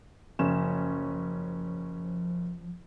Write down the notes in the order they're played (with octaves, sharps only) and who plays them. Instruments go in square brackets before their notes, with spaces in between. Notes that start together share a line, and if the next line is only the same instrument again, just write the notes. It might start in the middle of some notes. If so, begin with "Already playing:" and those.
[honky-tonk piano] F#1 C#4 E7 [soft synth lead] F3